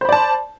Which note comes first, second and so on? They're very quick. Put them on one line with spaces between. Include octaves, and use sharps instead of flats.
C5 B5 D5 A5